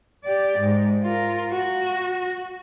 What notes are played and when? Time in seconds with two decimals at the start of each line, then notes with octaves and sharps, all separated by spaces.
0.24 G4 D5
0.59 G#2
1.03 F4 A#4
1.51 F#4